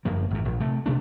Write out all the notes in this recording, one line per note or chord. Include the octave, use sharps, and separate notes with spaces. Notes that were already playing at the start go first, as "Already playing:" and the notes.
G1 F#2 F3 A#3
G#1 E2
A#1
C3 A3
B2 A3 D4